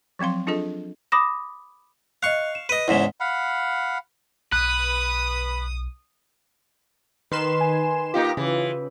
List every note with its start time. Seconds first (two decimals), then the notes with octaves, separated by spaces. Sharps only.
0.19 F3 F#3 C4 F5 C6
0.47 D4 F4 G#4 A4 D#5
1.12 B5 D6 D#6 A#6 E7
2.23 D#5 F5 C#6 F#6
2.55 E7
2.69 B4 D#5 D#7
2.88 E2 G#2 C#3 E4 B6
3.20 F5 F#5 B5
4.52 B1 B4 D#6 F#6
7.32 D#3 B4 C6 E7
7.60 G#5
8.14 A#3 D#4 F4 G4
8.37 C#3 E3